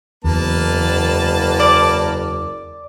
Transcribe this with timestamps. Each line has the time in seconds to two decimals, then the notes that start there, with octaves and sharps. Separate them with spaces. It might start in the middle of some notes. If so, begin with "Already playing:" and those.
0.24 F#1 E2 A#3 B4 A5
1.60 D5